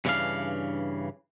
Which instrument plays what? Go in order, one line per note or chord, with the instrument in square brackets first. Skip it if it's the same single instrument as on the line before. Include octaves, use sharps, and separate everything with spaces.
[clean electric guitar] G2 C#3 E3 F#3 D4 F5